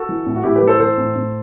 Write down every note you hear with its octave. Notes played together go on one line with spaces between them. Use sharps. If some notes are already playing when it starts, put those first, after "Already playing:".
Already playing: F#4 A4
E3
A2
F#4
A2 E4 G4
G4 B4
E3
A4 C5
E3 A4 C5
A2
A2